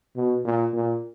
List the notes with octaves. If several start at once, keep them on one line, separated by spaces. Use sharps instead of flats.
B2
A#2
A#2